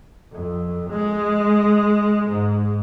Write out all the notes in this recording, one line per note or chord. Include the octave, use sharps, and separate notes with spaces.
F2
G#3
G#2